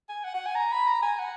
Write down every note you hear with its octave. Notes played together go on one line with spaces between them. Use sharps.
G#5
F#5
F#5
G#5
A#5
B5
A#5
G#5
F#5